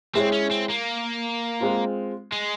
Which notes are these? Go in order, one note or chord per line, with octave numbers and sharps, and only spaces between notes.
G#3 C4 E4 G#4 C#5
C#4
C4
A#3
G#3 C4 F4
G#3